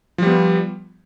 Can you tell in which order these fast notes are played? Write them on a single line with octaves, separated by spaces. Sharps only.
F3 G3 B3